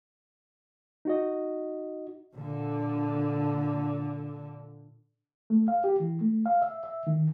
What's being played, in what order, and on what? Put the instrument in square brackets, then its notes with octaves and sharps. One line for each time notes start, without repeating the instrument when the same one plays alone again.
[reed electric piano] D#4 F#4 D#5
[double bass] A#2 [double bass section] D3
[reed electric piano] A3
F5
G4
E3
A3
F5
E5
E5
D#3